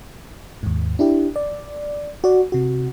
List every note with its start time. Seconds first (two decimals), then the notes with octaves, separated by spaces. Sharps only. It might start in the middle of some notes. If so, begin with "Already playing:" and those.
0.63 D#2 G#2
0.99 D4 E4 G4
1.36 D5
2.24 F#4 D5
2.52 C3 F#4